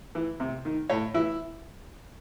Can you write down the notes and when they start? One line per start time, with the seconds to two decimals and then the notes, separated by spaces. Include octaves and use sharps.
0.15 E3
0.40 C3
0.65 D#3
0.90 A2 C#5
1.14 E3 E4